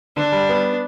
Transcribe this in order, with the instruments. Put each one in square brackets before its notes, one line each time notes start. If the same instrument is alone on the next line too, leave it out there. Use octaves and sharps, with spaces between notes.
[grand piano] D3 [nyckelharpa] D4
[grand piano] G3
B3